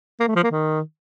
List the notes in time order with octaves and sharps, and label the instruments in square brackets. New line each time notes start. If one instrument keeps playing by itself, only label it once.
[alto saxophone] A#3
A3
F3
A#3
D#3